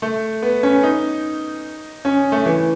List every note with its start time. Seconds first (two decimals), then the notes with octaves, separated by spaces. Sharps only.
0.02 A3
0.42 B3
0.63 C#4
0.83 D#4
2.05 C#4
2.32 A3
2.46 E3